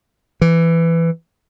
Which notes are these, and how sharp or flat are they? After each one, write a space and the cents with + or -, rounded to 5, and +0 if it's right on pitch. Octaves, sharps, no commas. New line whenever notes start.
E3 +15